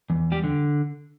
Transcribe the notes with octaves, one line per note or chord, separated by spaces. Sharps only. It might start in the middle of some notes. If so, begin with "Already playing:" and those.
E2
G3 G4
D3